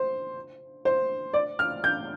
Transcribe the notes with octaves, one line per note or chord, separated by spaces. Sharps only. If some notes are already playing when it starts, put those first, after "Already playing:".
Already playing: C5
C5
D5
F6
G6